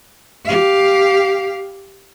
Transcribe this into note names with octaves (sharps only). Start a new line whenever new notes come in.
G4 F5